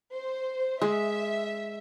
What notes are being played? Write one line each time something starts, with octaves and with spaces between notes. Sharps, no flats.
C5
G#3 E5